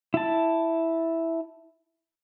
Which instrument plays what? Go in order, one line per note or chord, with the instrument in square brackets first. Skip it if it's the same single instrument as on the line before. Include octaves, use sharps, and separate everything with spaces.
[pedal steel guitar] E4 A5